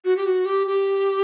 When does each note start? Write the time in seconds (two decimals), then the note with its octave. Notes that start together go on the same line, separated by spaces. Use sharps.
0.05 F#4
0.17 G4
0.26 F#4
0.45 G4
0.67 G4